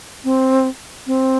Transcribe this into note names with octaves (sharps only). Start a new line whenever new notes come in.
C4
C4